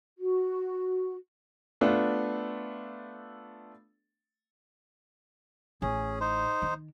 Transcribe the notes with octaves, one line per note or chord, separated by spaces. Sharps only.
F#4
A3 B3 D4 F4 A4
A1 C#4 G#4
D#4 C5
D#3